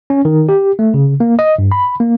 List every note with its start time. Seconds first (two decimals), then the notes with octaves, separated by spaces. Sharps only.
0.10 C#4
0.25 D#3
0.49 G4
0.79 A3
0.94 C#3
1.20 A#3
1.39 D#5
1.59 G2
1.72 B5
2.00 A#3